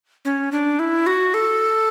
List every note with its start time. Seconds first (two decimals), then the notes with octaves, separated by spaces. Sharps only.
0.25 C#4
0.52 D4
0.79 E4
1.07 F#4
1.34 A4